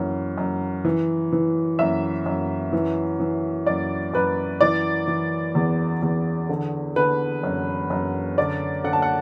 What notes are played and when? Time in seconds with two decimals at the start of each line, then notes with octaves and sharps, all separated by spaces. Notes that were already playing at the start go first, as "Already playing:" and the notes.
Already playing: F#2 E3
0.38 F#2
0.85 E3
1.33 E3
1.79 F#2 E5
2.26 F#2
2.73 E3
3.20 E3
3.66 F#2 D5
4.14 F#2 B4
4.61 E3 D5
5.08 E3
5.55 E2
6.02 E2
6.49 D3
6.96 D3 B4
7.43 F#2
7.90 F#2
8.38 D3 D5
8.84 D3 F#5
8.93 A5
9.02 F#5